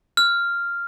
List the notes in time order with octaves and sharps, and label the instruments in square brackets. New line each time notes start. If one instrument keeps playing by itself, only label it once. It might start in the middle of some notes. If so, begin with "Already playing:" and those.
[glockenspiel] F6